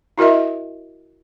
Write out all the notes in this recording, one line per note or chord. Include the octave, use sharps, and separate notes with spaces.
E4 F#4 A#4 D#5 E5